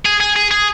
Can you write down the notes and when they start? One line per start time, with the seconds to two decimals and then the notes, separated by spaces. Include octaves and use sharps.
0.05 G#4
0.20 G#4
0.36 G#4
0.51 G#4